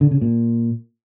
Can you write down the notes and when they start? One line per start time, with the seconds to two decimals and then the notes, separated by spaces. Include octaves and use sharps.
0.01 D3
0.11 C#3
0.21 A#2